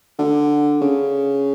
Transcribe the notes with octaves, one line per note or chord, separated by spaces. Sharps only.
D3
C#3